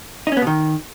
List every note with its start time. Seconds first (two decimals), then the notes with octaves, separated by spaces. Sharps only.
0.27 D#4
0.32 C#4
0.37 B3
0.42 B2
0.47 D#3